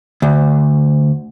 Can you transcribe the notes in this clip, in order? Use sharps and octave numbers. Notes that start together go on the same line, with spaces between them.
D2